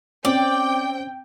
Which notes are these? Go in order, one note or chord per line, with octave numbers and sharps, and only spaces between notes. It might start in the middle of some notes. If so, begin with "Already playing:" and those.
C4 C#4 D5 G5